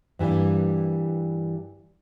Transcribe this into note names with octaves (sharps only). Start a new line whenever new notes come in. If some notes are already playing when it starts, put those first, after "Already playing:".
G2 E3 G3 A#3